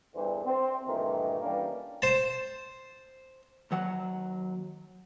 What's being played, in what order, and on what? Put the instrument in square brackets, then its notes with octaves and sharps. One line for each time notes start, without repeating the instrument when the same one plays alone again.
[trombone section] E2 G2 D3 E3 C5
C4
G2 A#2 D#3 E3 A3
E3 G3 A#3 C#4 D4
[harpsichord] C5 A5
[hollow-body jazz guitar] D#2 F#3 F#5